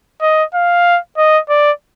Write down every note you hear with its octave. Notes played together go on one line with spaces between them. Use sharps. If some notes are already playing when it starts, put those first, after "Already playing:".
D#5
F5
D#5
D5